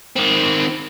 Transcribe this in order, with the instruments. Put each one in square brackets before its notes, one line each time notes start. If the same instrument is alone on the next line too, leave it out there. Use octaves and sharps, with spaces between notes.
[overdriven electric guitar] D#3 C4